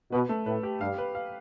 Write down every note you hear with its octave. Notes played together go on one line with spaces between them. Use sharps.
B2 B4
A3
A2 B4
G4
G2 F5
B4
F5